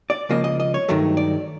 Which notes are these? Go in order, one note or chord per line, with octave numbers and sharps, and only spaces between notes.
D5
C#2 C#3 F3 A#3 D#5
D#5
D#5
C#5
G2 D#3 F#3 A3
D5